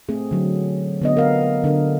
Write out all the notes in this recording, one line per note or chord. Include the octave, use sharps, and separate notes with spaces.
A3 C4 G#4
D3 F#3
D3 B3 D#5
A#4 F5
D3 A#4